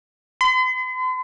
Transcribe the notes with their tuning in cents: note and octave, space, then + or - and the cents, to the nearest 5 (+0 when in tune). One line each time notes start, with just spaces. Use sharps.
C6 -45